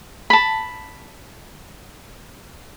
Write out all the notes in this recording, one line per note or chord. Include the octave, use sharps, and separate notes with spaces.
A5 B5